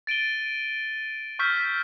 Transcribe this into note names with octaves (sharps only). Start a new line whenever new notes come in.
A6 D7 D#7 G7
C#6 E6 F6 G6 B6